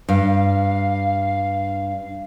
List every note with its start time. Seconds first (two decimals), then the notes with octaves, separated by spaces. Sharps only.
0.09 G2 F5